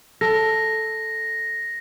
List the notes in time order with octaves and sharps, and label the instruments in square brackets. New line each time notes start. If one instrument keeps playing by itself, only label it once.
[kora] A4 [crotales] A#6